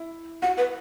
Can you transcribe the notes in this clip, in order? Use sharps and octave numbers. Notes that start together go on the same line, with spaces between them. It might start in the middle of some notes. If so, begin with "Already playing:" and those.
Already playing: E4
F#4 F#5
B4